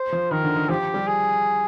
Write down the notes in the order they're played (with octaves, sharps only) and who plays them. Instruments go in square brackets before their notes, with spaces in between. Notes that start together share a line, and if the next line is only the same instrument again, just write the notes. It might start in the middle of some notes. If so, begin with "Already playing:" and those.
Already playing: [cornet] C5
[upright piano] F3
[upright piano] D#3 [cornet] A#4
[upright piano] D3
D#3
[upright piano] F3 [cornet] G4
[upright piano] G3
[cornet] G#4